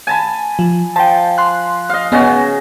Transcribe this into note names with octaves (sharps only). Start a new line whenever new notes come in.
G#5 A5 B5
F3
F3 G5 A5
C6 F#6
D#5 F5
C#3 B3 C#4 F#4 D#5 A6